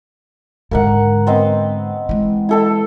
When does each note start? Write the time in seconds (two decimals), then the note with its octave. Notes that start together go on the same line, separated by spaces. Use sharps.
0.71 G#2 D3 A#3 A#4 F#5
1.27 B3 C4 D#5
2.09 E3 G#3
2.49 E4 A4 G5